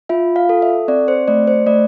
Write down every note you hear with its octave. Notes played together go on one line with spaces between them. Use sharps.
F4 E5
F5
A4
E5
C4 D5
C5
A3 D5
C5
A3 D5